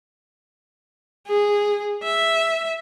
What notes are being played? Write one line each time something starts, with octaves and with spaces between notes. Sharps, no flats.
G#4
E5